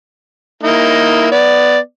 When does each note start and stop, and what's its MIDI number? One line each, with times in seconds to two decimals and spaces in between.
0.63 1.28 58
0.63 1.28 63
0.63 1.28 64
1.32 1.78 59
1.32 1.78 74